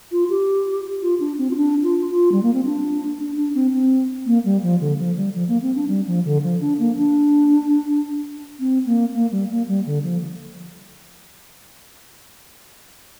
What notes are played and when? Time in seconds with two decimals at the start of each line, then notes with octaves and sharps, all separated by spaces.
0.12 F4
0.30 G4
1.02 F4
1.20 D4
1.38 C4
1.51 F4
1.56 D4
1.83 F4
2.10 F4
2.32 G3
2.43 A#3
2.54 C4
2.65 D4
3.19 D4
3.36 D4
3.55 C4
3.73 C4
4.26 A#3
4.45 G3
4.63 F3
4.81 D3
4.99 F3
5.17 G3
5.35 F3
5.48 A#3
5.62 C4
5.76 D4
5.89 G3
6.07 F3
6.25 D3
6.43 F3
6.61 D4
6.79 A#3
6.97 D4
8.60 C4
8.86 A#3
9.14 A#3
9.32 G3
9.50 A#3
9.68 G3
9.86 D3
10.03 F3